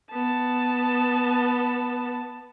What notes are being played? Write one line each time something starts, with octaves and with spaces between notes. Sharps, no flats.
B3 A5